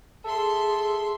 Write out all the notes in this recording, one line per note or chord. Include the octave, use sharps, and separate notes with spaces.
G#4 A4 E5 C6